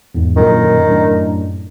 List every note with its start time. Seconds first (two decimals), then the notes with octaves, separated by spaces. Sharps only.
0.15 E2 G#2
0.36 F#2 A#2 D3 D#3
0.87 F#2 A2 D4